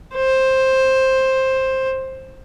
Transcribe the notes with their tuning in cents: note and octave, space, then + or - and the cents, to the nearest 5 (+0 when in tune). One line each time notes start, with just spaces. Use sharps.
C5 +10